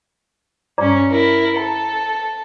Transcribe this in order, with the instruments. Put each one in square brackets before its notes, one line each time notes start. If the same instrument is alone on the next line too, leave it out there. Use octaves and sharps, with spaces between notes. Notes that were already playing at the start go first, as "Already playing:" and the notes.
[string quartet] G2 C#4 [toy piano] D5 A#5 D6
[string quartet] E4 A#4
[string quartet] A4 [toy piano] A#5